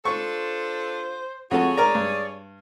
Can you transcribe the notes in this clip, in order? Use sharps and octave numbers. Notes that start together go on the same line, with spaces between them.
D4 F4 A4 C5 C#6
F2 F#4 G#4 A4 C#5
A#4 D5 A#5
G2